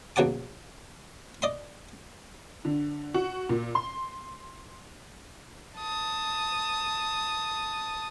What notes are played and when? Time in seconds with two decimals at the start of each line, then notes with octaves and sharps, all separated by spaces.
0.16 A#1 B2 C#5 F#5 A5 D6
1.42 D5 D#5 C6
2.65 D3
3.14 F#4
3.49 A#2
3.75 C6
5.78 A5 D#6